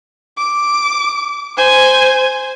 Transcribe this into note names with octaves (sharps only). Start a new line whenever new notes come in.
D6
C5 G#5